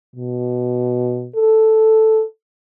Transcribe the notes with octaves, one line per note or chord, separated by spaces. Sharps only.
B2
A4